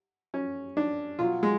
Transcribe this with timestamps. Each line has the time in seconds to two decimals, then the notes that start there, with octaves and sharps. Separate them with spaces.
0.34 C#4
0.77 D4
1.19 B2 F#3 F4
1.43 G#3